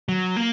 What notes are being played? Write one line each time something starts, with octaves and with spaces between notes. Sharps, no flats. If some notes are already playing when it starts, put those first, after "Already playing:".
F#3
A#3